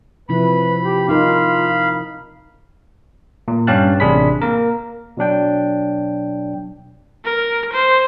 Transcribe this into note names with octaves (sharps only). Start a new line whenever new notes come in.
C3 F3 E4 B4 B5
G4
D#4 F4 A#4 F5 B5
A#2
G2 C#4 G4 F5 A5 F#6
A1 C3 D4 G#4 B5 B6
A#3 A#4
B2 F#3 D4 G5
A#4
C5